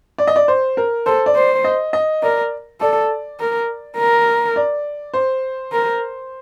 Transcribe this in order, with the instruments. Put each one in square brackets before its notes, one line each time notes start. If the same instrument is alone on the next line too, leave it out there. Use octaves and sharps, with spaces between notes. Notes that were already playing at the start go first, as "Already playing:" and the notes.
[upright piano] D5
D#5
D5
C5
A#4
[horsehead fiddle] A4 [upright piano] C5
[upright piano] D5
[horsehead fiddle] C5
[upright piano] D#5
D#5
[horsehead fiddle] A#4 [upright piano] D5
[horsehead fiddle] A4 [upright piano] D5
[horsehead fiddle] A#4
A#4
[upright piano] D5
C5
[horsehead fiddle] A#4